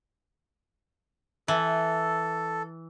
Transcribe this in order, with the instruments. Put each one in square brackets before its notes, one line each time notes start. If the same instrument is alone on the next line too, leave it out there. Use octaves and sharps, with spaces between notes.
[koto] E3 [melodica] A4